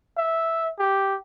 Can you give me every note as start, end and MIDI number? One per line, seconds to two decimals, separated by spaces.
0.17 0.68 76
0.79 1.16 67